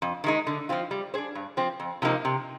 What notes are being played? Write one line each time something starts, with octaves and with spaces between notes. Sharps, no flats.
F2
D#3 G#3 D#4
D3
F3 C4 F4
G3
D4 G#4 C5
G2
F3 C4
F2
C3 F3 A#3 D#4
C3